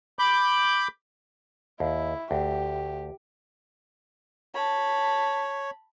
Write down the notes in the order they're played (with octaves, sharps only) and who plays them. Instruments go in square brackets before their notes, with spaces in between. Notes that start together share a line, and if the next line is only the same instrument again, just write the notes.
[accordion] B5 D6 G6
[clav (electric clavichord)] D#2 [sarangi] E4
[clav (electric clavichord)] D2 [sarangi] G4
[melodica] C#5 [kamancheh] A5 B5